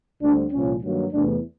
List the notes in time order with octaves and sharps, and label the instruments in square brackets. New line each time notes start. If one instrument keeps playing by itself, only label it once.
[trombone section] D2 D3 G3 C4 D4
C2 A#2 F3 C#4
G2 D#3 F#3 A#3
E2 C3 E3 A3 D4